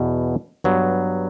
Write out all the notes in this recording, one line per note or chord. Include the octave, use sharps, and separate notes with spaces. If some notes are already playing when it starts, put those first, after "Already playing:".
Already playing: E2 B2
G2 F#3 B3